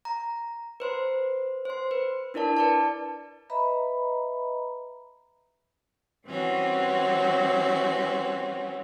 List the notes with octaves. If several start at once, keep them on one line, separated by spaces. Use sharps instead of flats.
A#5
B4 C5 C6
C5 C6
B4
D4 E4 A#4 D5 A5
B4 D5 A5
B4 D#5 E5 A#5 B5
E3 G3 C4 C#4 F#4